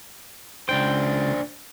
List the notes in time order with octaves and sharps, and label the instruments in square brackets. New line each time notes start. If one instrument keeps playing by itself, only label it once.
[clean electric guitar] C#2 G5 [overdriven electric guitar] D4 C5